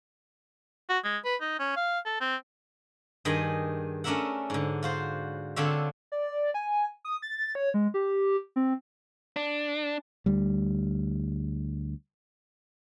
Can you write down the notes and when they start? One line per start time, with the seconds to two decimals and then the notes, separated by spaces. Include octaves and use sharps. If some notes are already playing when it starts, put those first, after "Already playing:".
0.89 F#4
1.04 G#3
1.25 B4
1.41 D#4
1.59 C#4
1.76 F5
2.05 A4
2.21 C4
3.25 G2 D#3 G#4 D#5 B5
4.04 A3 C#4 D4 A#4 E5 F#5
4.50 G#2 D3
4.83 F4 F#4 C5
5.56 D3 C4 D4 F4 C#5 E5
6.12 D5
6.54 G#5
7.05 D#6
7.22 A6
7.55 C#5
7.74 G#3
7.94 G4
8.56 C4
9.36 D4
10.26 D2 G3